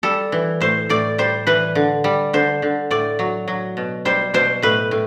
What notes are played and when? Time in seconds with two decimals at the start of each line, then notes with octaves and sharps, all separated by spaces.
0.03 G3 A4
0.32 E3
0.61 A2 C5
0.89 A2 D5
1.18 G3 C5
1.47 E3 B4
1.75 D3
2.04 G3
2.33 D3 C5
2.62 D3
2.91 A2 D5
3.19 F#3
3.48 F#3
3.77 B2
4.05 G3 C5
4.34 B2 C5
4.62 A2 B4
4.91 A2